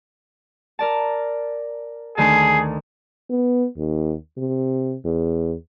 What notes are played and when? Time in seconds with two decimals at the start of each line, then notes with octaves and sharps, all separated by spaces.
0.79 A#4 D5 A5
2.17 D2 D#3 G#4 A5
3.30 B3
3.78 D#2
4.38 C3
5.05 E2